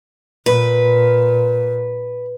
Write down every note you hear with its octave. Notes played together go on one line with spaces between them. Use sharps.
A#2 B4